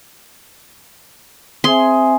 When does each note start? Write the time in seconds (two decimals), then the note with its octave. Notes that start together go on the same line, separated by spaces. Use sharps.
1.64 C4 G#4 C5 E5 G#5 C6